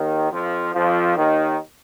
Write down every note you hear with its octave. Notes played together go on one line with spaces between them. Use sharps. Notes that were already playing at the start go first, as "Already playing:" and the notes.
Already playing: D#2 D#3
F2 F3
F2 F3
D#2 D#3